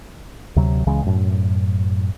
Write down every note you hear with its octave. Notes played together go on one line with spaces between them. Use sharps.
D2 C3 F#3
C#2 C#3 E3 G#3
F#2 A2